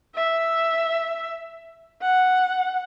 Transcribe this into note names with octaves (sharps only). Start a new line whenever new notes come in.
E5
F#5